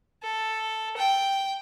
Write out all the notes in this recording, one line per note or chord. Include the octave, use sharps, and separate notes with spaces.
A4
G5